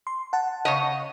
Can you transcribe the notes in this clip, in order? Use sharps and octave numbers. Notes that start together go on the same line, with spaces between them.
C6
F#5 A5
C#3 C#5 D#5